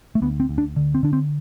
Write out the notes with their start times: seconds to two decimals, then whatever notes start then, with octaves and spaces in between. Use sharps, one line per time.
0.15 A3
0.22 D2 B3
0.40 C4
0.49 D2
0.58 D4
0.76 D3
0.95 C4
1.03 D3 D4
1.13 C4